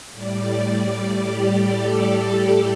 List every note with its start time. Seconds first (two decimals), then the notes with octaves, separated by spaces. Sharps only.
0.12 A2 G3 D5
1.15 G4
1.65 A4